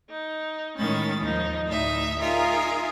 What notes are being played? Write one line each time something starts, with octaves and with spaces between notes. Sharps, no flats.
D#4
A2 D#3 G#3 C#4 B5 A6
D#2 F3 D#4
D2 A2 D#4 E5
D#4 F4 G#4 A#4 E5